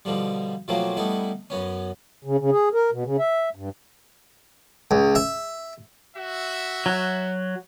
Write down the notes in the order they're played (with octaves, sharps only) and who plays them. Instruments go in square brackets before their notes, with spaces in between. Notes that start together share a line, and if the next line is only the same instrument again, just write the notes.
[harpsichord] B2 D3 F3 G3
B2 F3 F#3 A3 A#3 C4
G3 A3 B3 D#4 E4
F#2 B3 C#4
[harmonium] C#3
C#3
G#4
A#4
B2
C#3
E5
G2
[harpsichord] C#2
E5
[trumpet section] F#4 E5
[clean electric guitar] F#3